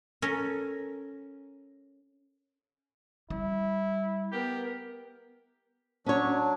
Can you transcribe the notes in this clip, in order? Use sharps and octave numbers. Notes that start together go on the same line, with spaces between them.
C#4 A4 A#4
G3 E4
B3 G4 A#4
F#3 C#4 D4 C#5